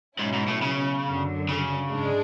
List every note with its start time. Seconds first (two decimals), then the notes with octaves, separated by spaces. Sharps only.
0.19 G#2 B2 F#3 C#4 E4
0.33 G#2
0.48 A2
0.62 C#3
1.06 F#2 D3 F#3
1.49 C#3
1.91 G#2 G#3 D4